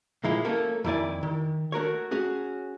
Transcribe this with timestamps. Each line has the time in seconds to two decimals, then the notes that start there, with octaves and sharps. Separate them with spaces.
0.24 C2 A#2 F3 G#3 E4
0.45 A3 A#3 C#4 A4
0.84 F2 D#3 E4 F#4 D5 G#5
1.23 D#3
1.72 A3 F#4 A#4 C#5
2.11 C#4 F#4 G#4